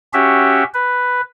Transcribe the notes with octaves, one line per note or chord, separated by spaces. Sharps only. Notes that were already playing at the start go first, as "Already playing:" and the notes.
C#4 F#4 G4 E5
B4